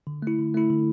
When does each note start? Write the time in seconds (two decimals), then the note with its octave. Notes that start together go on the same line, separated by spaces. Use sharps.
0.07 D3
0.22 A3 E4
0.39 D3
0.54 A3 E4
0.70 D3